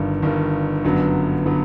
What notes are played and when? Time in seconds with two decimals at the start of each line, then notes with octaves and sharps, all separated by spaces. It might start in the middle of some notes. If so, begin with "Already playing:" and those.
Already playing: G1 G2 D#3
0.22 G1 G2 D#3
0.84 G1 F#2 D3 F#3 B3
1.46 D3 F#3 B3